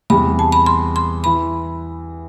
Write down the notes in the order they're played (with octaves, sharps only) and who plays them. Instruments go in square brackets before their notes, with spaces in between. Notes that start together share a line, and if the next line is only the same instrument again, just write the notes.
[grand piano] E2 C3 G3 [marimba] B5
[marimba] A5
B5
C6
C6
[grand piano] E3 [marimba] B5